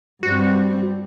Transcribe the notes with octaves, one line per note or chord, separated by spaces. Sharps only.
G2 G3 C4 F#4